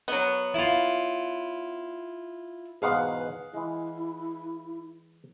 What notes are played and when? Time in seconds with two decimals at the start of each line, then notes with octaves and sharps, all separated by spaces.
0.08 F#3 B3
0.54 E4 F4
2.82 E2 G#2 B2 G#4 B4 F5 F#5
3.54 E3 G#3 E4